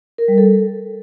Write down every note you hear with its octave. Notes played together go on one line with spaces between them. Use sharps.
A#4
G3
A4